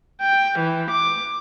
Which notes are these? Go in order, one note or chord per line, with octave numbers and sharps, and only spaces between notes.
G5
E3
D6